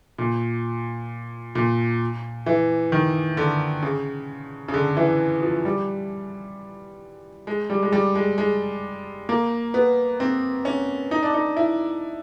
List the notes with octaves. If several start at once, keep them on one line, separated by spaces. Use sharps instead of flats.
A#2
A#2
E3
D#3
D3
C#3
C#3
D3
E3
F3
G3
G#3
G3
G#3
G3
G#3
G#3
A#3
B3
C4
C#4
D#4
D4
D#4
E4